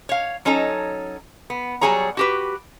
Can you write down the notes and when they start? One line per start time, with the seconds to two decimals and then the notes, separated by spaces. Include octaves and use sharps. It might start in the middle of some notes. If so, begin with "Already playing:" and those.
0.09 C#5 F5
0.45 F#3 C#4 D#4 A4 A#5
1.50 B3
1.81 F#3 G3 A#3 G#4 C#5 A#5
2.17 F#4 G4 B4